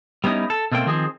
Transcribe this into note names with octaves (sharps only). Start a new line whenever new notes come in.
G3 B3 C#4 D#4 E4
A4
B2 A3 A#3 C4 G5
D#3 F3 C4 G#4